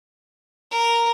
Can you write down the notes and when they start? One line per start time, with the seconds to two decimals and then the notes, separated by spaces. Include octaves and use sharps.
0.71 A#4